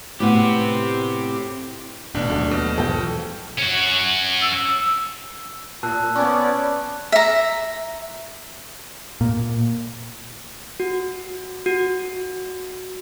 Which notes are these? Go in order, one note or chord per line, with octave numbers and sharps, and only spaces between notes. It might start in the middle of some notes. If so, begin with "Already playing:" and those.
A2 B3 C4 F#4 G4
D1 A1 B2 D4
D#2 F#3 A3
B2
B1 E2 F3 A4 G5
C#4 F#4
E6
A#2 A5 E6 F#6
B3 C#4 D5
E5 A#5
A#2
F#4
F#4